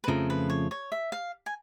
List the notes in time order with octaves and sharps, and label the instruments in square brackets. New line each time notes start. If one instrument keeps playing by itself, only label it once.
[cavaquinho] B4
[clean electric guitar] F2 C#3 F3 A3 [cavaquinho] A#4
[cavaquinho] B4
C#5
C#5
E5
F5
G#5